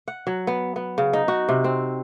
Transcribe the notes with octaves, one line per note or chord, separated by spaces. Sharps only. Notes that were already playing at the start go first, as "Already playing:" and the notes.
F#5
F#3
B3
B3
C#3
D#4
F#4
C3
C4